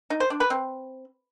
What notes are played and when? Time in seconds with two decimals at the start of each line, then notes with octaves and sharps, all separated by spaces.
0.10 D#4
0.20 C5
0.30 D4
0.40 B4
0.50 C4